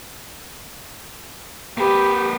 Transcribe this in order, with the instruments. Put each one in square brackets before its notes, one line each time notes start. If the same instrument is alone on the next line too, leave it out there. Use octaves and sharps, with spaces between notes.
[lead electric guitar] A#3 B4 [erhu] G4